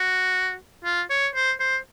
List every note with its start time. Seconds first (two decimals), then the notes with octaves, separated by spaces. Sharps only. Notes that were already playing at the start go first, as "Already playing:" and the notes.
Already playing: F#4
0.84 F4
1.10 C#5
1.35 C5
1.60 C5